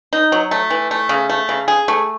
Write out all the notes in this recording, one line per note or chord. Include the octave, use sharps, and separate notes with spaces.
D#4
F#3
A3
E3
A3
C#3
A3
C#3
G#4
A3